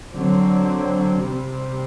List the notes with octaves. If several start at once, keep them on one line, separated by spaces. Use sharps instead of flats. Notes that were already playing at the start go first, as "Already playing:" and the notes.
D3 F#3 C4
C3 G3 C4